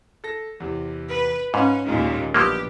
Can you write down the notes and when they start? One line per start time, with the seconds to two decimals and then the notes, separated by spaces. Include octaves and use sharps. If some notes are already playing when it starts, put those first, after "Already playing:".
0.24 A4 A#6
0.60 E2 C3
1.09 B4
1.54 G#2 C#4 B4 F5 B5
1.86 D#2 A#2 D#3 G#3 C#4 F4
2.34 A#1 B2 F3 F#3 A#3 G4 B4